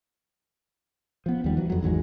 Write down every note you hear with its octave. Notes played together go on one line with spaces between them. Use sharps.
F3 B3
D#2 G3
E3 F#3
F2 F#3
G#1 E2 F#3 G#3